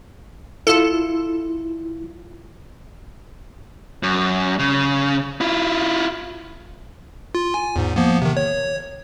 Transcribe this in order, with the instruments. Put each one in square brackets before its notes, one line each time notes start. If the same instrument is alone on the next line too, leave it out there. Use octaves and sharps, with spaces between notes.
[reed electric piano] E4 F4 [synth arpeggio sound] A4
[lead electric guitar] F#2
C#3
E4 F4
[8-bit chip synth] F4
G#5
E2 G#2
F3 A#3 B3
C3 D#3
C#5